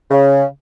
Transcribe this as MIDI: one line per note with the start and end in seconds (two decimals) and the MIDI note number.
0.11 0.44 49